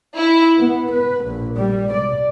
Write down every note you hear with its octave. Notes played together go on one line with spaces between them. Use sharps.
E4
B3
B4
A#1
G3
D5